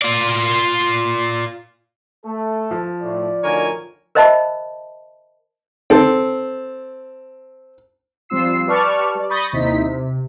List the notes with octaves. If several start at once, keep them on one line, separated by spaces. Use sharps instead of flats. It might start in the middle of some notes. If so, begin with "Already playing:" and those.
F4 D5
A3 A4
F3
A2 D5
D2 D3 D#3 A#4 C#5 G#5
A#4 C5 D#5 E5 A5 B5
C4 A4
F3 G3 C4 F4 E6 C7
G4 B4 D5 A5 C#6 F6
G3 D5
B5 C#6 D#6 G6 A6 A#6
D#2 C3 C4 D#4 E4 B6
C3